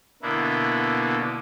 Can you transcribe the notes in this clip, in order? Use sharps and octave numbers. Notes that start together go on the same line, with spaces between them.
B2 D3 A#3 B3 E4